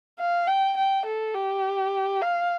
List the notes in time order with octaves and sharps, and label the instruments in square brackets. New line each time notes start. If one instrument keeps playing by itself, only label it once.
[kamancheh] F5
G5
G5
A4
G4
F5